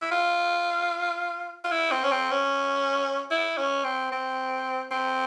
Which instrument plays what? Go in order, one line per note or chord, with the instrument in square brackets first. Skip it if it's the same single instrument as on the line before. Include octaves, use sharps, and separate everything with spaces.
[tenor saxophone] E4
F4
F4
E4
C4
C#4
C4
C#4
E4
C#4
C4
C4
C4